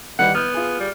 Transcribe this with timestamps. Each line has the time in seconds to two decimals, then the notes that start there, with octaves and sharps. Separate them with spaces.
0.19 D#3 G3 B4 F#5
0.35 B3 F6 G6
0.54 F4 G#4
0.80 G3